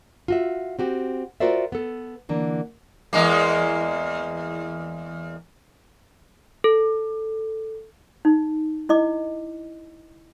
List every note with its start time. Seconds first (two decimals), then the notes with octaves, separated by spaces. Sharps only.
0.28 F4 F#4 E5
0.79 C4 F#4 G4
1.40 F4 F#4 A#4 C5 D5 E5
1.72 B3 A4
2.29 D3 E3 A#3 D4
3.13 E2 G#3 A#3
6.64 A4
8.25 D#4
8.89 E4 D#5 D6